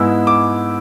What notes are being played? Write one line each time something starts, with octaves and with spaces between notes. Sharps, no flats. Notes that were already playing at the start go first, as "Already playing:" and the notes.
Already playing: G#2 G#3 B3 E4 E6
D6